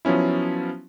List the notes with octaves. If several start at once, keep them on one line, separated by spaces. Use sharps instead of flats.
F3 F#3 B3 C#4 E4